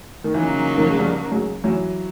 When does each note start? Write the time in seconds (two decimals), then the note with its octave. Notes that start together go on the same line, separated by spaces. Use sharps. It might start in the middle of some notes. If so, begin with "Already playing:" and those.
0.24 D#3
0.34 C#3 E3 F#3 A#3 D#4
0.56 E3
0.77 D#3 F3
0.89 G#3
0.99 F3 G3
1.31 F#3 G#3
1.64 E3 F#3